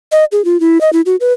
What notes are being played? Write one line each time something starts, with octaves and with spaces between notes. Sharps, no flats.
D#5
G#4
F4
E4
D#5
E4
F#4
B4